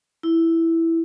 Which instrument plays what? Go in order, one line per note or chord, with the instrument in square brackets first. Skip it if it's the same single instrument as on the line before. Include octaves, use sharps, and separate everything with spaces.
[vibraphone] E4